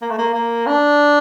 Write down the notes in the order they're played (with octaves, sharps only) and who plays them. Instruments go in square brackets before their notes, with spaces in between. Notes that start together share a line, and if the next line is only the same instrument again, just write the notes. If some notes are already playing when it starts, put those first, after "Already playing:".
[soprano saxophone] A#3
A3
A#3
A#3
D4